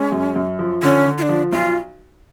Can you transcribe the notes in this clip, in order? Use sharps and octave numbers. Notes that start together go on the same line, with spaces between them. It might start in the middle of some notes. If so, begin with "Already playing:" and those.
Already playing: G#3 C#4
F#2
F#2
F3
D3 C#4
D3
F4
D4
F3
B1 F4